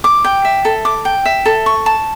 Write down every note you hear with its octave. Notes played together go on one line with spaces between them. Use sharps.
D6
G5
E5
A4
D6
G5
E5
A4
C#6
A5